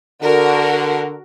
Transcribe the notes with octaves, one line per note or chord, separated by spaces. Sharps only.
D3 F#4 A#4